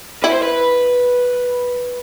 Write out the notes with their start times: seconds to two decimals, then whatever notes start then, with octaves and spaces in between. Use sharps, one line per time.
0.23 E4 B4
0.32 C5
0.43 B4